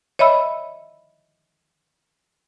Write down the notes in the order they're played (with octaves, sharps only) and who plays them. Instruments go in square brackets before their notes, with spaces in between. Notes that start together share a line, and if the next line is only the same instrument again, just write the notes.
[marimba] C#5 D#5 E5 B5 E6